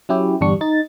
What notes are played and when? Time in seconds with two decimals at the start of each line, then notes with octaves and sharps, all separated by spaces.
0.09 F#3 C#4 E4 G4
0.41 G1 E2 G3 D4 C#6
0.61 D#4 A6